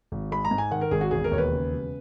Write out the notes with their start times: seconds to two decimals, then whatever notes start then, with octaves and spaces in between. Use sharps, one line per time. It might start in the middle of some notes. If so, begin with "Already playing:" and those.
0.12 G#1
0.32 G#3 B5
0.45 A#5
0.51 G#2
0.58 G#5
0.71 D#3 F#5
0.81 A#4
0.91 G#1 G#4
1.01 F#4
1.11 E1 G#4
1.24 A#4
1.31 D#2 C#5
1.38 B4
1.52 C#3
1.71 E1